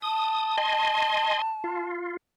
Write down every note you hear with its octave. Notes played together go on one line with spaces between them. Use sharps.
A5 D#6
D#5 G#5 C6
F4